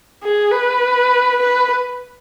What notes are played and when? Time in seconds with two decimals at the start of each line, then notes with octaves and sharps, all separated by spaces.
0.24 G#4
0.52 B4
1.40 B4